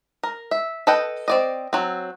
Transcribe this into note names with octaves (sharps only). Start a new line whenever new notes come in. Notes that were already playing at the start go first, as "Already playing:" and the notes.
A#4
E5
A4 B4 D#5 G5
C4 D5 D#5
F#3 C4